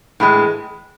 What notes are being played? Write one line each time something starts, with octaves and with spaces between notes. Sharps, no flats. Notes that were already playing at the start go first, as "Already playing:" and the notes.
A2 E3 G#3